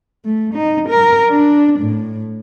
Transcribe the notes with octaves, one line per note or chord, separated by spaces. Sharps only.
A3
D#4
A#4
D4
A2